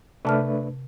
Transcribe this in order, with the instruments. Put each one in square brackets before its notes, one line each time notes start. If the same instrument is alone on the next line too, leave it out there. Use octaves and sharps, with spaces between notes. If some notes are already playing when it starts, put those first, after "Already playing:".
[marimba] C3 A5 F6 [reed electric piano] A3 D4 B4